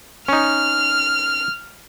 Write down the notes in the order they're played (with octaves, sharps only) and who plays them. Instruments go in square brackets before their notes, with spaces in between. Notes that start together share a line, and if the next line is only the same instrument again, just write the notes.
[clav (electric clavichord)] C#4 D#4 [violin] F6